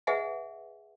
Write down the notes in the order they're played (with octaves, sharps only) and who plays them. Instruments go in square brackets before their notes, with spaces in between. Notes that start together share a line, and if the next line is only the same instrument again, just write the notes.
[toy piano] G#4 B4 D#5 E5 F#5 G#5